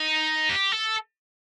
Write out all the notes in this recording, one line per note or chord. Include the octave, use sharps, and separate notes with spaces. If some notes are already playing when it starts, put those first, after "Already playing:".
Already playing: D#4
G4
A4